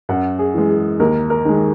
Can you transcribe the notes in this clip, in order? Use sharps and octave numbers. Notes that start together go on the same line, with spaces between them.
F#2 F#5
G#4
E3 G#3
G#4
D#2 A#4
A#4
D#3 G#3